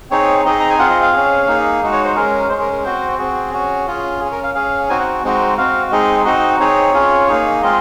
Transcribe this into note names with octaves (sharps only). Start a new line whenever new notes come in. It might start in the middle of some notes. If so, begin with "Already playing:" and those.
C4 D#4 G#4 C#5
C4 D#4 G#4 D#5
A#5
G#5
C4 F4 G#4 F#5
D#5
F5
C#4 G#4
A#3 D#4 G#4
G#3 D#4 F#4
C#5
C5
G#3 C#4 G#4 A#4
G#3 C#4 G#4 C5
A#4
A#4
C4 F#4 C5
C4 F#4 G#4
C#4 F#4
C#4 F4 G#4
G#4
C#4
A#4
F5
C#4 G#4 F5
C4 D#4 F#4 G#5
F#5
G#3 C4 D#4 F#4
C4 F#4 F5
G#3 C4 D#4 G#4 D#5
C4 D#4 F#4 D#5
C4 D#4 G#4 C#5
C#4 F4 G#4
A#3 D#4 G#4
G#3 C4 F4 G#4 D#5